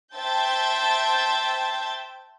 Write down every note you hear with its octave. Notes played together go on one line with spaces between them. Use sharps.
C5 E5 G5 A5 G6 A6